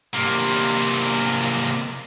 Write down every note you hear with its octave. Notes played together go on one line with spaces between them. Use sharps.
C3 A#3